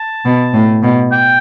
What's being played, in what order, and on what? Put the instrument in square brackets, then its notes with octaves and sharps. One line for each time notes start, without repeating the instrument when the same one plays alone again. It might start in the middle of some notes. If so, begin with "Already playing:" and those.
Already playing: [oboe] A5
[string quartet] B2
A2
B2
[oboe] G5